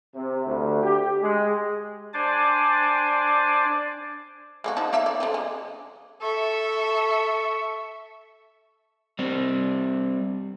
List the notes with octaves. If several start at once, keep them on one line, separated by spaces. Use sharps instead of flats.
C3
D2
G4
G#3
D4 C5 D5 G#5 D6
G#3 A#3 F#4
F3 D#4 A5
A#3 D#4 E5
D5
D3 F3
G#3
A4 E5 C#6
G3 C4 D4